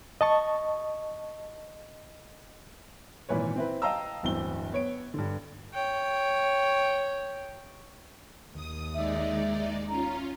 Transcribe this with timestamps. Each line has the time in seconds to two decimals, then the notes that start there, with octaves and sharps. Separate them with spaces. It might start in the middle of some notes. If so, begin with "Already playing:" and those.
0.21 D#5 A5 C#6
3.29 G#1 A#2 E3 B4 C#5
3.56 C4 E4 B4
3.82 D#5 F5 G5 A5 A#5 E6
4.23 D1 G1 E3 C4 G7
4.72 B3 C#5 D7
5.14 G2 D3
5.73 C#5 G5
8.52 D#2 D#6
8.94 G#3 D#4 D5 E5
9.89 C#4 F4 A#5